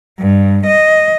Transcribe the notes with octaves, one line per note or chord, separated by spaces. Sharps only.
G2
D#5